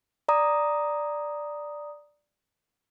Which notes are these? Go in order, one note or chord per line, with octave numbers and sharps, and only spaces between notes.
D5 A#5 D#6